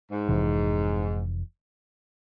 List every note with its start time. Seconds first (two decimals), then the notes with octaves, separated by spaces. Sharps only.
0.10 G#2
0.28 F1 F2 C3 E3